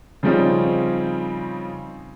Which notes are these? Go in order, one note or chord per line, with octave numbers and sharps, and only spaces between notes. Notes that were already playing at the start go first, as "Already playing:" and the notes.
C#3 F3 G3 C4 C#4 D#4